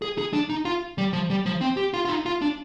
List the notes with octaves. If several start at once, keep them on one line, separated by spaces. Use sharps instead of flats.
G#4
G#4
D4
D#4
F4
G3
F3
G3
F3
C4
G4
F4
F4
D#4
F4
D4